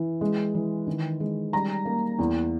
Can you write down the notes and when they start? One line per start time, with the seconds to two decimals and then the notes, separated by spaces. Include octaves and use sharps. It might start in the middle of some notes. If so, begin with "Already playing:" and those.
Already playing: E3
0.21 G#3
0.54 E3
0.87 D#3
1.20 G#3
1.53 G3 A#5
1.85 A#3
2.19 E2